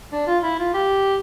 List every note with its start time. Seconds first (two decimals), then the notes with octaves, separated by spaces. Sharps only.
0.12 D4
0.27 F4
0.43 E4
0.59 F4
0.74 G4